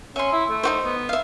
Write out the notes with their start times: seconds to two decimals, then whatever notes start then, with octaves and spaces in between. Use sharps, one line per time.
0.16 C#4 E5 C6
0.32 E4
0.50 A3
0.63 D#4 F#4 C5
0.84 B3
1.09 E5 F5